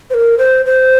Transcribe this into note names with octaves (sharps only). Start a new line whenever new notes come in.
C5
A#4
C5
C5